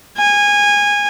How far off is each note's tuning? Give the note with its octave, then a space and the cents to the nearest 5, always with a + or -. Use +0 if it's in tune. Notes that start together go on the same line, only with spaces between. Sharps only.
G#5 -20